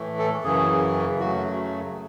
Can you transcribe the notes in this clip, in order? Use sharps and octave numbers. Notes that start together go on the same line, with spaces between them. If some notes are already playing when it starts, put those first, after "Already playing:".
Already playing: A2 E3 A3
A4
F#2 C#3 E3 G#4
F#2 C#3 F#3 A3 F#4